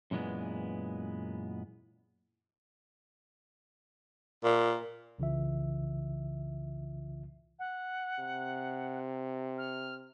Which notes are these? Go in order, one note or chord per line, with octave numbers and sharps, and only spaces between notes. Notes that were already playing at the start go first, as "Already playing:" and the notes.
F#2 A#2 E3 G#3 B3
A#2
C2 C#3 E3 F4 E5
F#5
C3
F6